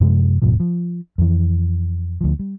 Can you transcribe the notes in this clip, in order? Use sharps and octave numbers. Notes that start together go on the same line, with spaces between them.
F#2 C3 F3 G#3
D#1 G#2 B2 F3
F3
F2 E3
D2 F3
G3